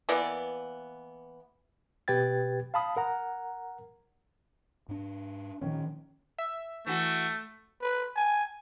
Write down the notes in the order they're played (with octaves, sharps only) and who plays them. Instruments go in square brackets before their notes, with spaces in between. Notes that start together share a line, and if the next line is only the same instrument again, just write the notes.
[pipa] E3 A#3 B3 D5
[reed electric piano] B2 G4 B4 G5 G#6 A6
F5 A5 B5 D#6
A#4 F#5 A#5
[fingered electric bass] G#2 D4
[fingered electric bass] A#2 F3 [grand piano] D#3 C#4
[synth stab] E5
[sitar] E3 F#4 [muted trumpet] A3
[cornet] B4
G#5